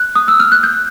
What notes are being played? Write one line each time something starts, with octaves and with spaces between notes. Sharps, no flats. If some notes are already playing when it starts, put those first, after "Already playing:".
Already playing: F#6
D#6
E6
F6
F#6
G6